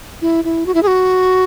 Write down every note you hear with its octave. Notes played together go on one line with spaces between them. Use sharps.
E4
E4
F#4
E4
G#4
F#4